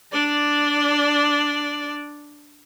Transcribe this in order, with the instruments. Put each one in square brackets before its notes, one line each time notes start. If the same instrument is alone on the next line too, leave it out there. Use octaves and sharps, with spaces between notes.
[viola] D4 D5